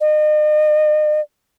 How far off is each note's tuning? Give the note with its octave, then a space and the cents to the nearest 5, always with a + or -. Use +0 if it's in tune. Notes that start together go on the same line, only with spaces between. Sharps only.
D#5 -40